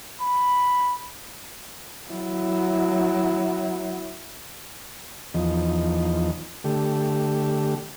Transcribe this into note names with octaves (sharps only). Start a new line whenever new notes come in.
B5
F#3 E4
E2 F3 D#4
D3 A3 G4